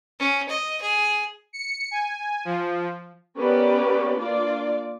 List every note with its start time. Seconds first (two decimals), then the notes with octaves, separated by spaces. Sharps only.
0.19 C#4
0.49 D#5
0.81 G#4
1.53 C#7
1.91 G#5
2.45 F3
3.36 B3 C#4 G4 A#4 B4 D5
4.17 A#3 D4 F4 D5